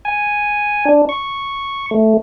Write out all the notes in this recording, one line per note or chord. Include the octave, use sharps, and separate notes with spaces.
G#5
D4
C#6
A3